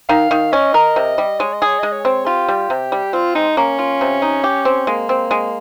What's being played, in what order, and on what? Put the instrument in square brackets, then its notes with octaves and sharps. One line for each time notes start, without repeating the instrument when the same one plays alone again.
[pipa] D#3 [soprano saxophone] F5
[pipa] D#3
[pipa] C#4 [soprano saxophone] D#5
[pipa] A#4
C3
G3
[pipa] G#3 [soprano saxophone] C#5
[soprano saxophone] D#5
[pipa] G#4 [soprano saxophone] C#5
[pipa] G#3 [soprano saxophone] D#5
[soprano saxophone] C#5
[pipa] C4
[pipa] F4 [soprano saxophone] G4
[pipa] G3
C3
G3
[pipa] C4 [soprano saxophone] F4
[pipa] G#3 [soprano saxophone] D#4
[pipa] A#3 [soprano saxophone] C#4
[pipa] F4
C3
D#4
G4
C4
[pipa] G#3 [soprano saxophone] A#3
[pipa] C4
G#3